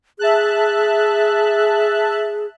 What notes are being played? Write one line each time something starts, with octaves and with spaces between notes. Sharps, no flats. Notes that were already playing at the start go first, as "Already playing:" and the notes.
G#4 E5 A5 F#6